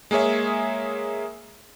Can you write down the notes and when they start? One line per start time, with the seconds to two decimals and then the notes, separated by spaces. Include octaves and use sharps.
0.11 G#3 A#3 G#4 C#5 E5